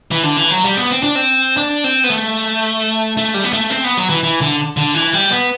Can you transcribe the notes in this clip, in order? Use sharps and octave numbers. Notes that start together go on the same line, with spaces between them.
E3
D3
E3
F#3
G3
B3
C4
D4
C4
D4
C4
B3
A3
A3
G3
B3
A3
C4
B3
F#3
E3
E3
D3
D3
E3
G3
B3